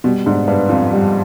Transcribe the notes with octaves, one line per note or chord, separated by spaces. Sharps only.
B2 G3
G#2 D4
G2 B4
F2 F4
G3